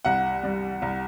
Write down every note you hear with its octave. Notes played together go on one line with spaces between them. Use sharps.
C2 F#5
G3
C2